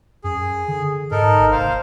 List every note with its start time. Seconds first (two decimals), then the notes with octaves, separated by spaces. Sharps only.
0.24 F#2 G#4
0.68 D3
1.11 G#2 D#4 A4 A#4
1.38 G1
1.52 F1 C5 F5